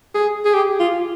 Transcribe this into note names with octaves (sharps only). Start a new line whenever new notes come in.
G#4
G#4
G4
F4